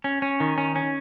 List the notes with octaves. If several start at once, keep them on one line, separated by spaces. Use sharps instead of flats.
C#4
C#4
D#3
C#4
C#4